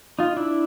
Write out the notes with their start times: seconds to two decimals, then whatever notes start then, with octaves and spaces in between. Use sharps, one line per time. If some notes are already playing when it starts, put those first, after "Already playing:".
0.19 D#4 F4
0.37 D4 E4